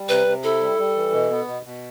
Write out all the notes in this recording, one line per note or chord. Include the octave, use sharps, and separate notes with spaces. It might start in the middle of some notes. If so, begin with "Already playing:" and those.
Already playing: G3
C3 B4
C3
E4 A4
G3
G3
E3
B2
B3
B2
B2